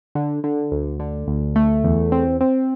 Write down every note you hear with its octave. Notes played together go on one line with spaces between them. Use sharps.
D3
D3
D2
D3
D2
A3
E2
C4
C4